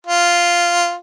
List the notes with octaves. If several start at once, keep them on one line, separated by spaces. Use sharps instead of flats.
F4